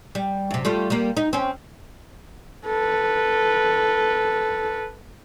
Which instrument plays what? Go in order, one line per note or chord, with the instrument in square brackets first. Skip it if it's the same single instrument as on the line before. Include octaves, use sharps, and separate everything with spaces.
[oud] G3
F#2 C3
G3 A3 F4
G3 A#3
D#4
C4 C#4
[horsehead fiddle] A4 B4